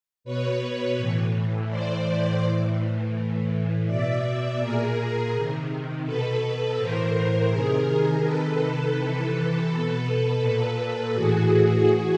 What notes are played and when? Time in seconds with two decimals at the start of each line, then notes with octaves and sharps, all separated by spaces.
0.24 B2 B4 C#5
0.97 A2 E3
1.69 A2 E3 C5 D5
2.42 A2 E3
3.14 A2 E3
3.87 B2 D5 E5
4.59 A#2 G#4 A#4
5.32 C3 D#3
6.05 B2 A4 B4
6.77 A2 E3 A#4 C5
7.50 C3 D#3 G#4 A#4
8.22 C3 D#3 A4 B4
8.95 C3 E3 A4 B4
9.67 B2 A4 B4
10.40 A#2 A4 B4
11.13 A2 E3 F#4 G#4
11.85 E3 F#4 G#4